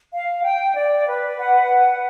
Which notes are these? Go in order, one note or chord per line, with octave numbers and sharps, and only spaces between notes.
F5
G5
D5
B4
F#5
B4